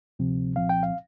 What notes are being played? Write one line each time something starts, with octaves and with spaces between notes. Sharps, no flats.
D2 C3 F3 C4
C2 A#2 F3 C4 F5
G5
F5